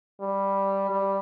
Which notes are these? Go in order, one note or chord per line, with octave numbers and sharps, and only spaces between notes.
G3
G3